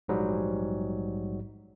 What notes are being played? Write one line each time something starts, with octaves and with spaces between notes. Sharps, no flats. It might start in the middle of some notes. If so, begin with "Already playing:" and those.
A#1 G#2 F#3 G3